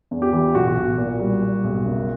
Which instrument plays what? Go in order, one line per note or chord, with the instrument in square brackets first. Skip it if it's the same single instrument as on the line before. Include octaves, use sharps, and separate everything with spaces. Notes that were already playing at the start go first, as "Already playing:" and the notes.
[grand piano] E2
G4
E3
B1 F#4
B1
A#2
G3
G3
B1
F#1